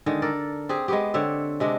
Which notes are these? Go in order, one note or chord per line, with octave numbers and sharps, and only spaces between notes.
D3 D#3 G#3
A4 A#4 D5
C4 G4 G#4
G#3 B3 G4
D3 C4 C#5 E5
C3 G#3 D4